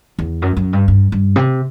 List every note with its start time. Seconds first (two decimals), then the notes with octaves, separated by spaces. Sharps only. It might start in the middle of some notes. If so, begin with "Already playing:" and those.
0.19 E2
0.42 F#2
0.57 F#2
0.73 G2
0.88 G2
1.12 G2
1.36 C3